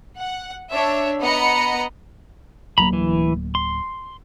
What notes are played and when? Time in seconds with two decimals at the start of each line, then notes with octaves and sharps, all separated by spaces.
0.18 F#5
0.70 D4 C#5 E5
1.20 B3 D#5 F#5 A#5 B5 C#7
2.78 D1 F#3 A#3 A#5 B5
2.93 E3
3.55 C6